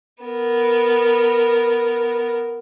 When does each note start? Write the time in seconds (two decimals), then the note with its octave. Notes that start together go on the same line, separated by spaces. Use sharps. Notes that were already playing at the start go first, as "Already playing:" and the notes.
0.23 B3 A#4